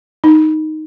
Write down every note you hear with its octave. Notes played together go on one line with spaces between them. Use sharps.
D#4